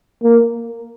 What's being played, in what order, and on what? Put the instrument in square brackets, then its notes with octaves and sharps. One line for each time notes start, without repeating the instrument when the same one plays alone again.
[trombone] A#3